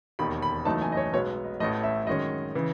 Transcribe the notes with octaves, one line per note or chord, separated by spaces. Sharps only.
E1 D#2 D#3 B5
B5
F#1 F#2 E3 A3 D#4 A5
G#5
D#5
C#5
B1 B2 G#3 B3 C#5
D#5
A1 A2 E3 A3 D#5
E5
F#2 D#3 G#3 C#4 D#5
C#3 E3